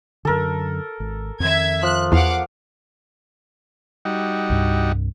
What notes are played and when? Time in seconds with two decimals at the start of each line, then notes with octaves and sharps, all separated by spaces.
0.25 F#2 D3 A4 A#4
1.00 G#1
1.40 F2 D#3 E5 G#6
1.83 F3 F#6
2.12 E2 F5 F#5 D6
4.05 G3 D#4 F#4
4.50 C2 G2